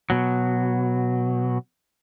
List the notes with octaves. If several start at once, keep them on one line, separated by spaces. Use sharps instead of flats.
B2 F#3